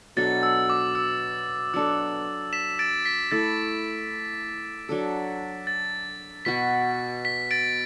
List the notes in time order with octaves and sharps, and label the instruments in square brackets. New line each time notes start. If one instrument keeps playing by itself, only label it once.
[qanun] B2 F#3 D4 A4 [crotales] A6
[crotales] E6
D6
E6
[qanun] F#3 D4 A4 [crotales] E6
[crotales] B6 E7
A6 D7
B6
[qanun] A3 E4 A4 [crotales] A6
[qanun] F#3 D4 A4
[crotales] A6
[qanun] B2 B3 F#4 [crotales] B6
[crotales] B6
A6 D7